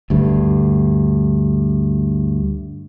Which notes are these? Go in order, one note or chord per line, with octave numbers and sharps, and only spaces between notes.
D2 G2